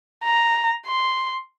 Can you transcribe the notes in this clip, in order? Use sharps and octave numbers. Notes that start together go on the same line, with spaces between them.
A#5
C6